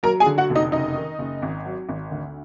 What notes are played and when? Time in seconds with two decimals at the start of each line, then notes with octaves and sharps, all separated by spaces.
0.03 F#3 A#4 A#5
0.20 G#4 G#5
0.26 D3
0.38 F#4 F#5
0.50 F1
0.55 D#4 D#5
0.72 F#1 D#4 D#5
0.96 D#3
1.19 F#1
1.42 G#1
1.65 F#3
1.89 G#1
2.11 D2